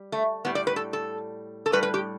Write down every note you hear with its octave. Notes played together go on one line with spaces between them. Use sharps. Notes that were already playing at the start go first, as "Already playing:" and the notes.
Already playing: G3
A3
A2 G3 B3
D5
B4
A4
A4
A4
A2 G3 B4
B4
G4